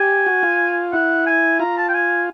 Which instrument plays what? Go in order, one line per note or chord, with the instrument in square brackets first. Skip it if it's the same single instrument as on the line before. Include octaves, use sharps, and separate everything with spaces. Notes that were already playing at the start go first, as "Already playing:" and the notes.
Already playing: [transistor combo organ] G4 [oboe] G#5
[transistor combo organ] F#4
F4
[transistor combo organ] E4 [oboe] F#5
[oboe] G#5
[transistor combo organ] F4 [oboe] A#5
[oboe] A5
G5
G#5